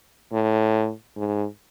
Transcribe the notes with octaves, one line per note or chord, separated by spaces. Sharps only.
A2
G#2